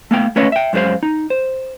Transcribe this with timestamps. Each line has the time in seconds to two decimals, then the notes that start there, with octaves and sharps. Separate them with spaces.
0.11 A3 B3 F5 G5
0.36 A3 C#4 B4 C#5 D#5 F5
0.52 E5 G5
0.73 F#2 G#3 E4 C5 F5
1.03 D#4
1.30 C5